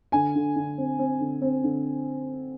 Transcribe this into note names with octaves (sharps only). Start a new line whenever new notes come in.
D3 G#5
D3
D3
C4
C4
D3
C4
D3